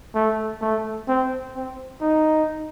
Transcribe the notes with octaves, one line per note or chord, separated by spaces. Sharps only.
A3
A3
C4
C4
D#4